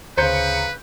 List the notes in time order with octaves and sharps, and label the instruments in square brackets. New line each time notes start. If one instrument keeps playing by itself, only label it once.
[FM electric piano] D2 A#5 C#7 [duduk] C#3 [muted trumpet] B4 [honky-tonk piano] C5 G6